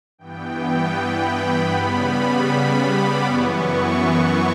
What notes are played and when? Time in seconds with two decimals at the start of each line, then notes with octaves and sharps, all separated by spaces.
0.18 G2 E3 B3 G5
0.95 B5
1.34 B5
1.72 C#3 G3 B3
2.11 B5
2.88 D6
3.26 F#2 E3 B3 C#6
4.04 C#6